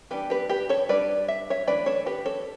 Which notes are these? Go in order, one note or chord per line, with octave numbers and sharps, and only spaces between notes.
E3 G3 B3 D4 G4 B4
G4 B4
G4 B4
A4 C#5
G3 D4 B4 D5
E5
C#5 E5
E3 A3 D4 B4 D5
A4 C#5
G4 B4
A4 C#5